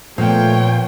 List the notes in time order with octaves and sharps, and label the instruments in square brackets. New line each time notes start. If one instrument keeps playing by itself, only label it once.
[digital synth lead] A#2 [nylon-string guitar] F3 B3 [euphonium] A3 [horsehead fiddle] C#5 G5